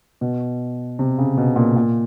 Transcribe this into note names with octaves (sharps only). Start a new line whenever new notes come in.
B2
C3
C#3
B2
A#2
A#2